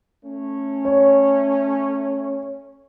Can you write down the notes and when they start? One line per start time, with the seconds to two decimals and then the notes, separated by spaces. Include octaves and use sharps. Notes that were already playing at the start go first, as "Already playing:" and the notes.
0.24 A3 C#4
0.85 C#5